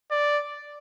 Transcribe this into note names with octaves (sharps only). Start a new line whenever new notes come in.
D5